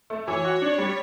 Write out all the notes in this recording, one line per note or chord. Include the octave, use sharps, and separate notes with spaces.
A3
E3 C#5
F#4
D4
G3